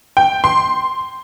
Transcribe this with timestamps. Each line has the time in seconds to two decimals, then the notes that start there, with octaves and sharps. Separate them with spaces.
0.17 G5
0.44 C6